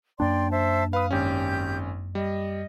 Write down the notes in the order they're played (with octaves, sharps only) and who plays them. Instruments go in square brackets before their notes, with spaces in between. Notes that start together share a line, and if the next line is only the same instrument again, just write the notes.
[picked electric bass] F#2 A#3 D4 [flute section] D5 G5 C6
[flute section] C5 E5 A5
[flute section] B4 [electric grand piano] F5 D#6
[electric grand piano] G#1 C#4 [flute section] G4 G6
[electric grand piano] G3 [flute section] D#5